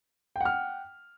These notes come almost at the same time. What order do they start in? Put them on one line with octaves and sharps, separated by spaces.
G5 F#5 F6